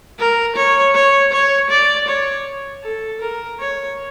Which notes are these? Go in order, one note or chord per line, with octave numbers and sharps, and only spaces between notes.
A#4
C#5
C#5
C#5
D5
C#5
A4
A#4
C#5